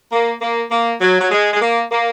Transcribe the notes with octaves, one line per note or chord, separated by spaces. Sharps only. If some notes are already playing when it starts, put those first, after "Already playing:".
A#3
A#3
A#3
F#3
F#3
G#3
G#3
A#3
A#3